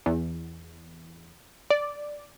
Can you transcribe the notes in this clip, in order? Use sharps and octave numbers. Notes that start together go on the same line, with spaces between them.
E2
D5